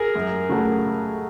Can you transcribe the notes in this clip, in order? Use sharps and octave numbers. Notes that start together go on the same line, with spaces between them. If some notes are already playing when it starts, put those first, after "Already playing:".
Already playing: G#4 A#4
F#2
C#3 F#3 A3